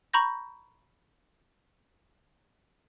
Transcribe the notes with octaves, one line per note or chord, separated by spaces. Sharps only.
A#5 B5 C#6 G6 A#6